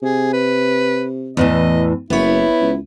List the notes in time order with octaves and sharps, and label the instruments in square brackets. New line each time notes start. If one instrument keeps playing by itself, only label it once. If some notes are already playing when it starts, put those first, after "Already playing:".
[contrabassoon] C3 [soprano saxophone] G#4
[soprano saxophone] B4
[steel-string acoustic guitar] E2 A2 E3 [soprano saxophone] D#5
[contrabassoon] F#1 [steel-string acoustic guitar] B3 C#5 [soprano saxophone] E4
[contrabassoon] C#2